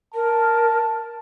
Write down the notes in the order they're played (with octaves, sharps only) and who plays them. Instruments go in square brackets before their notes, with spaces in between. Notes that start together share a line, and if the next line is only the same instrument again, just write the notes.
[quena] A#4 [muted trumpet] A5